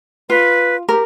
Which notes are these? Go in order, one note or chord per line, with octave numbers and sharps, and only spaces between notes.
F4 B4
G4 A#4